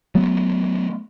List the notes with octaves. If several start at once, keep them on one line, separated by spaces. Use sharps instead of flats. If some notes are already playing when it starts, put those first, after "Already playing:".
F#3 A3 B3